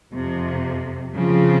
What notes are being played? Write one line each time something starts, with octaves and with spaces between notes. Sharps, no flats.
F2 C3 F3
C#3 F3 C4 F4